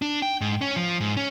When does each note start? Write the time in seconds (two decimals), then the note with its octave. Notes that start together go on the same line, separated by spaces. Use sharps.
0.02 D4
0.22 G5
0.41 G#2
0.61 C#4
0.76 F3
1.00 G#2
1.17 C#4